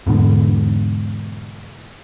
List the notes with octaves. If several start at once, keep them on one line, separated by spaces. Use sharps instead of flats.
E2 G#2 B2 D3